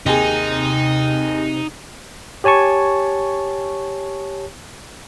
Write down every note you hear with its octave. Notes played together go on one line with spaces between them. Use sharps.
D#2 C3 D#4 G#4
G4 C#5 G#5 A5 C#6